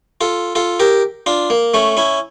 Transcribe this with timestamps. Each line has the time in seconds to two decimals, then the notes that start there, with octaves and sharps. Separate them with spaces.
0.21 F4 A4
0.55 F4 A4
0.80 G4 A#4
1.26 D4 F4
1.50 A#3
1.74 A3 C#4
1.97 C#4 E4